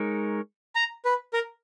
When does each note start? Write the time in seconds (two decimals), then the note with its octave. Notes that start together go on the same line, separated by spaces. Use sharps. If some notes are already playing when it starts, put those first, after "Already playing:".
Already playing: G#3 D#4 A#4 C#5
0.75 A#5
1.05 B4
1.33 A#4